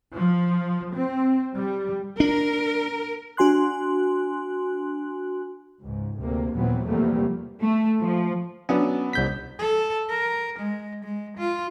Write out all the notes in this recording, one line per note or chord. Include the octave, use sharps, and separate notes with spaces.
F3
C4
G3
D4 A#4
D4 F#4 G#5 C6 F#6
C#2 G#2
D2 C3 A#3
D#2 A#2 E3 F#3 B3 C4
E2 C3 F3 G3 A3 A#3
A3
F3
F#3 B3 C#4 D4
C2 G6 B6
A4
A#4
G#3
G#3
F4